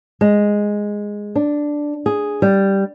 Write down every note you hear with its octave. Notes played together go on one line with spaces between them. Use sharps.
G#3
D4
G#4
G3